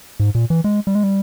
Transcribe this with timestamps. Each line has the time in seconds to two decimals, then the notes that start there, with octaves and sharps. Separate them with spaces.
0.20 G#2
0.35 A#2
0.50 E3
0.64 G#3
0.87 G3
0.95 G#3
1.04 G3